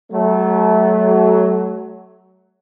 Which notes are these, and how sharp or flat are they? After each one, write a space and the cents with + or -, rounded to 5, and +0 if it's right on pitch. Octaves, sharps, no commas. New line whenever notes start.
F#3 +20 A3 -20